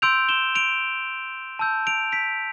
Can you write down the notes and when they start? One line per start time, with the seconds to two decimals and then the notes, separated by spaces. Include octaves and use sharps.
0.02 C6 E6 G6 D7 F7
0.29 E7 G7
0.55 D7 F7
1.59 A5 E6 G6
1.87 D7 F7
2.12 B6 D7